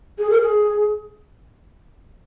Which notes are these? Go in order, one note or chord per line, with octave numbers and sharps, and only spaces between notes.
G#4
A#4
G#4